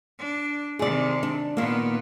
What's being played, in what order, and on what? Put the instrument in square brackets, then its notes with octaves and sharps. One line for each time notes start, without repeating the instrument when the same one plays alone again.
[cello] D4
[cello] C3 D#3 [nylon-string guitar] G#4 D5
[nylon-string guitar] D4
[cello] A#2 B3 [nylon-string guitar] D#3 A#3